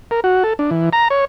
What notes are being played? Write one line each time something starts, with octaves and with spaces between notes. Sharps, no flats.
A#4
F#4
A4
D4
E3
A#5
C#5